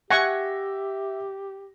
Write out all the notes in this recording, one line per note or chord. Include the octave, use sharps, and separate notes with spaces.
G4 E5 F#5 G#5 C#6 A#6